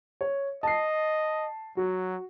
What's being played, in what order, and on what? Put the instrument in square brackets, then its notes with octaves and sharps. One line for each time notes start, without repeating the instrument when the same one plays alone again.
[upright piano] C#5
[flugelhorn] D#5 [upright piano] A5 C7
[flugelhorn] F#3 [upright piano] F#4